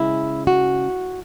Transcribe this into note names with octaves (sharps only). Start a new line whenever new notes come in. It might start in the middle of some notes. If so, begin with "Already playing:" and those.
Already playing: C#3 G#3 C#4 E4
F#4